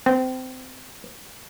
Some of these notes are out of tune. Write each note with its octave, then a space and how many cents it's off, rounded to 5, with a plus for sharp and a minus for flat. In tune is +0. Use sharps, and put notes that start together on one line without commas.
C4 -25